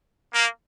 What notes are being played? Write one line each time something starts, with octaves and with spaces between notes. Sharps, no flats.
A#3